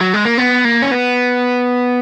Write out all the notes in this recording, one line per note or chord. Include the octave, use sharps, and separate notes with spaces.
F#3
G#3
A#3
B3
A#3
C#4
B3